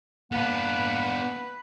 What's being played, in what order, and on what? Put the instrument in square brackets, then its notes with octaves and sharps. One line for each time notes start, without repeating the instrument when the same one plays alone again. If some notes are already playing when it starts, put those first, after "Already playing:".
[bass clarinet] A#3 [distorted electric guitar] B3 D4 [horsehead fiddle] B4 [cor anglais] F#5